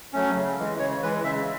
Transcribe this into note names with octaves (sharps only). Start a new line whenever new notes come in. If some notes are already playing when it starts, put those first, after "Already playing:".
F#3 A3 C#4
C#3
E3 G#3
C#3 C#5
E3 G#3 B4
C#3 E5